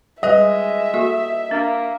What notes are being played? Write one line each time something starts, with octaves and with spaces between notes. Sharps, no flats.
G3 G#3 B4 D#5 E5
A#3 F#4 A4
A#3 D4